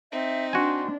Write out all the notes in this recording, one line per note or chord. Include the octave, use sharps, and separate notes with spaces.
C4 D#4 E5
D4 F#4 G#5 C6